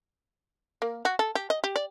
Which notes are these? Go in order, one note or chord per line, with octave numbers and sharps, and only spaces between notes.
A#3
F#4
A4
G4
D#5
G4
D5